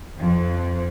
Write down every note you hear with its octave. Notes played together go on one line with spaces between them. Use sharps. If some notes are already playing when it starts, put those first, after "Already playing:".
F2